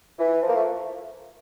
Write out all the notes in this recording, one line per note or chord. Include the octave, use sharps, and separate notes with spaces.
E3
F3
A#3
A3